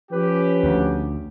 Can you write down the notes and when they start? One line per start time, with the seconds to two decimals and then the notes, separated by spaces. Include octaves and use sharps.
0.12 F3 C#4 G4 B4
0.63 D2